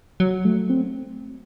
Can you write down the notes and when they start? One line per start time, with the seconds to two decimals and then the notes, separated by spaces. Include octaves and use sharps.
0.20 F#3
0.45 A3
0.70 C4